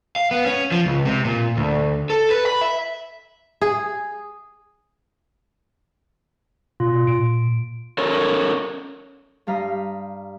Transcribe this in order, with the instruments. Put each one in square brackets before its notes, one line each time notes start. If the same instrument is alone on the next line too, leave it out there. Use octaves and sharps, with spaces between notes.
[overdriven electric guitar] F5
B3
C#4
F3
C#2
C3
A#2
D2
A4
B4
B5
E5
[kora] G#4
[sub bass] B2 [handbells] F4
[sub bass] A#2 [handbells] D7
[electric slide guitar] C#4 A4 A#4 C#5
[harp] G2 G3 F5 A#5 B5 D#6